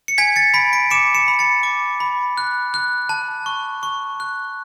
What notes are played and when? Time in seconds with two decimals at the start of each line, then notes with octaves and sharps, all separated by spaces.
0.08 C#7
0.18 G#5 G#6 B6
0.36 A6 C#7
0.54 B5 B6 D7
0.73 B6 D7
0.91 D6 C#7 E7
1.15 C#7 E7
1.28 B5
1.39 A6 C#7
1.63 D6
2.00 B5
2.38 F#6
2.74 F#6
3.09 A5
3.46 C#6
3.83 C#6
4.20 F#6